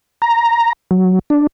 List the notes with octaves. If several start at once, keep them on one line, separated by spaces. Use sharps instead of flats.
A#5
F#3
D4